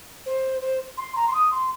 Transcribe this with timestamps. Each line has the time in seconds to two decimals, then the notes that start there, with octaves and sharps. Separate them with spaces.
0.26 C5
0.61 C5
0.98 C6
1.16 A#5
1.28 C6
1.34 D#6
1.52 C6